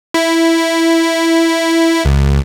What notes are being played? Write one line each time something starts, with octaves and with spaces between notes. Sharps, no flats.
E4
C#2